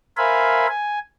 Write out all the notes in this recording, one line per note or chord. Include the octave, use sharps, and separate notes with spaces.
A#4 C5 E5 F5 G#5 B5
G#5